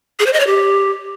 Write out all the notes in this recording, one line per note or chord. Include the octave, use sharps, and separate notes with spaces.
G#4
C5
D#5
C#5
G4